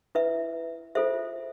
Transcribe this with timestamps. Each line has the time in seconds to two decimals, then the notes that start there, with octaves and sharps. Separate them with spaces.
0.15 E4 B4 E5
0.95 F4 A4 C5 E5